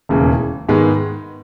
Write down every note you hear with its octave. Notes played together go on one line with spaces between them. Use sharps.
E1 D#2 C#3 E3
G#2 D#3 G#3 B3